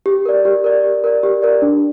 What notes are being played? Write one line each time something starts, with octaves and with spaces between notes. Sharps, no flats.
G4
A#4 D5
G4
A#4 D5
G4
A#4 D5
G4
A#4 D5
D4